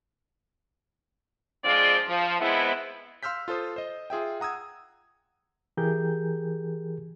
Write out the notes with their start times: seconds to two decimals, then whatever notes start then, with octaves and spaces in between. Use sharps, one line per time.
1.65 F3 G#3 C4 D4 F4 D5
2.07 F3
2.40 G#3 B3 C4 E4
3.23 F5 C6 E6 F6 G6 B6
3.48 F4 A4 C5 D#6
3.76 C5 D#5
4.10 F4 G#4 E5 G5
4.40 F#5 A#5 D#6 E6 G#6
5.77 E3 G4 G#4 A#4 G6